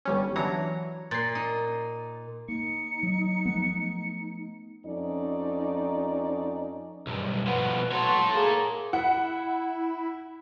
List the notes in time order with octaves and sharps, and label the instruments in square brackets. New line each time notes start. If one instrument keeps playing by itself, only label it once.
[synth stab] G1 G3 C#4
[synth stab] E3 F#3 D4 [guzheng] C#5 A#5
[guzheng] A#2 [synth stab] A6 C7
[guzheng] D#4
[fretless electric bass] A#3 [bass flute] D#4 [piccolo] C#7
[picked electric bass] F#3
[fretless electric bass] F3 A3 B3
[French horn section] F2 C#4 D#4 D5
[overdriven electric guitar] B1 G2
[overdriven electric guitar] B2 F3 [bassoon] B3 [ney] B4
[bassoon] F#3 [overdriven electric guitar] A4 C#5 [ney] C6
[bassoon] A#3 [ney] G#4
[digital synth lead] E4 [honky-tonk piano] F#5